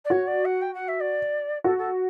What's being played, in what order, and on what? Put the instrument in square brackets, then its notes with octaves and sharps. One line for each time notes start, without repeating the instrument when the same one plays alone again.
[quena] D5
[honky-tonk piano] F#4 [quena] C#5
[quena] D5
F#5
G5
F#5
E5
D5
[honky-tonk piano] F#4 [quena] A4
[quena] A4